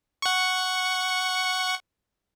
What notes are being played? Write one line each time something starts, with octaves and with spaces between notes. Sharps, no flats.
F#5 C#6